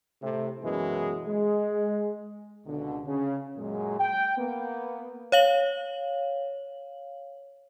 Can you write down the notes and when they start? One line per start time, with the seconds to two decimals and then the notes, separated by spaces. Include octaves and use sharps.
0.23 A2 C3
0.64 F#2 B2 E3 G#3
1.28 G#3
2.66 C#2 B2 D3
3.06 C#3 C#4
3.56 F#2 A#2 F#3 G#3
3.99 G5
4.37 A#3 B3
5.32 C#5 F5 F#7